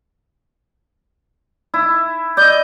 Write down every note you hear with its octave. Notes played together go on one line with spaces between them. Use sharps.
E4
D5 D#5 G6